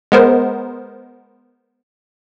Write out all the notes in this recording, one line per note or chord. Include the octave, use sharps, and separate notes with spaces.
G#3 B3 A#4 C5